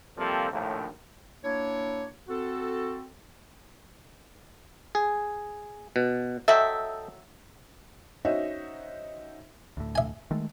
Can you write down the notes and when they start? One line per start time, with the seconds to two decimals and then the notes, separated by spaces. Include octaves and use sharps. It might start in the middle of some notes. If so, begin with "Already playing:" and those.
0.17 C3 F3 G3 A#3 C4 A4
0.51 A#1 D#2 A2
1.44 A#3 D4 E4 C#5
2.29 C4 F#4 A4
4.95 G#4
5.96 B2
6.48 F#3 A4 D#5 E5 G5
8.25 C#4 D#4 F#4 C5 D#5 E5
9.77 D2 A2
9.95 E5 G#5
10.31 D#3 G#3 A3